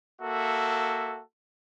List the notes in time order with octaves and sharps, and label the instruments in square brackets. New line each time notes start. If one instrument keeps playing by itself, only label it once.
[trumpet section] A#3 F#4 A4 E5